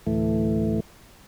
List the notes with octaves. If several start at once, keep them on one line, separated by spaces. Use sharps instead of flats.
D2 A2 E3 A3